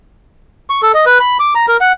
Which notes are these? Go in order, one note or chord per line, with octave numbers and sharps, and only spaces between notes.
C#6
A4
D#5
B4
B5
D6
A#5
A#4
F#5